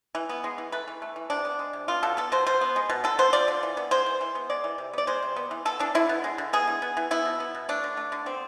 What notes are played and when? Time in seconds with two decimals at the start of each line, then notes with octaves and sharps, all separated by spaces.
0.15 E3
0.29 B3
0.44 G#3
0.58 E3
0.72 A3 B4
0.87 E3
1.02 A3
1.16 E3
1.30 C3 D4
1.45 B3
1.59 G#3
1.73 C3
1.88 B3 F4
2.03 B2 A4
2.17 B3 A4
2.32 B2 C5
2.47 B2 C5
2.61 B3
2.76 G#3
2.89 B2
3.04 D3 A4
3.18 B3 C5
3.33 F3 D5
3.48 D3
3.63 E3
3.77 B3
3.91 G#3 C5
4.06 E3
4.21 E3
4.35 B3
4.50 G#3 D5
4.64 E3
4.78 C3
4.93 B3 D5
5.07 G#3 C5
5.22 C3
5.36 B3
5.51 E3
5.65 B3 A4
5.79 E3 D4
5.95 D3 E4
6.09 B3
6.24 G#3
6.38 D3
6.53 B3 G#4
6.67 E3
6.82 B3
6.97 E3
7.11 B3 E4
7.26 B2
7.40 B3
7.54 B2
7.69 A3 D4
7.84 D3
7.97 A3
8.12 D3
8.26 B3 C4